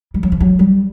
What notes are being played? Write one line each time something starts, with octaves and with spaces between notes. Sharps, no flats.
G3
F#3
F3
F#3
G3